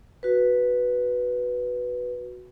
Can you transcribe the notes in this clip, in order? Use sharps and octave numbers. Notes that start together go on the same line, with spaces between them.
F#4 B4